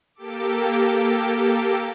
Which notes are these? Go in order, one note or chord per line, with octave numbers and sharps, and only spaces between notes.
A#3 G4 A4 D6